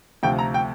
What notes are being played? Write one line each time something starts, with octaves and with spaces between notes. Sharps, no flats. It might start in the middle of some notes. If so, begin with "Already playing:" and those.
D2 C3 F3 G5
A#5
G5